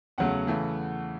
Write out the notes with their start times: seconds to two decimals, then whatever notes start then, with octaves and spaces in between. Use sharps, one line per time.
0.18 E2 C#3 F#3 A3 F#5
0.47 C#3 E3 A3